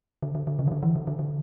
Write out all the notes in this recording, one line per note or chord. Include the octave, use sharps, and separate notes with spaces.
D3
D3
D3
C#3
D#3
D3
E3
D3
D3
D3